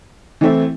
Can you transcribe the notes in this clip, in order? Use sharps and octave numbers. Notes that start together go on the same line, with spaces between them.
E3 A3 C4 E4